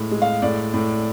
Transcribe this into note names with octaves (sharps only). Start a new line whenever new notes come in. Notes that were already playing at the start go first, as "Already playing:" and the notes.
Already playing: A2 G#3
G#3
F5
A2 D5
A2